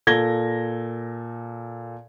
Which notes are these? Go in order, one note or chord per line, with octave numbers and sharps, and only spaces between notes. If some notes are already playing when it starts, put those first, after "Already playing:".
A#2 A4 G#6 A#6 G7